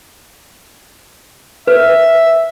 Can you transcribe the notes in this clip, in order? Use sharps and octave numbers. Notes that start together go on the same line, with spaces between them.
B4 E5